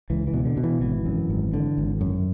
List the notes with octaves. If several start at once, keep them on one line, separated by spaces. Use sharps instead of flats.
C#2 E3
E3
B2
D3
B2
E3
G#1 E3
F#2
G#1
D3
G#1
F#2